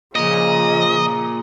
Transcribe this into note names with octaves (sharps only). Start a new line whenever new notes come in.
A#2 C#3 F3 D#5